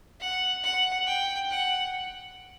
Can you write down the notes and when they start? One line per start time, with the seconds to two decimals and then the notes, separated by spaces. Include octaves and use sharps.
0.20 F#5
0.63 F#5
1.06 G5
1.50 F#5